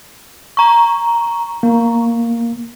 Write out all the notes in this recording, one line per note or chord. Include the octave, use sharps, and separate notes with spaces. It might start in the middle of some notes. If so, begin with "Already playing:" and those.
A#5 C#6
A#3